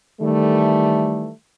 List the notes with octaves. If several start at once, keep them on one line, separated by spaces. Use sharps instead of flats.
D#3 E3 G3 A3